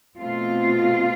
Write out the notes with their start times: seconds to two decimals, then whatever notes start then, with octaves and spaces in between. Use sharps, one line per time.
0.17 B2 A3 C4 F4